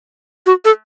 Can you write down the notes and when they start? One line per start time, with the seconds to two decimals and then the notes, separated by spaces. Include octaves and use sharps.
0.46 F#4
0.65 A4